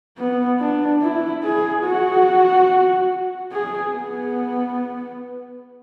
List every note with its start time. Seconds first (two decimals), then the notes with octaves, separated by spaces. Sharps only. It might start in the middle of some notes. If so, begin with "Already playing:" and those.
0.18 B3
0.60 D4
1.02 E4
1.43 G#4
1.84 F#4
3.52 G#4
3.94 B3